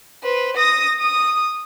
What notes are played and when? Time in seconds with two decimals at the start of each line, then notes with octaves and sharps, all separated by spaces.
0.23 B4 C5
0.57 D#6 A#6
1.00 D#6